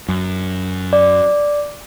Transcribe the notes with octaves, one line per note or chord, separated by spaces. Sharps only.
F#2
D5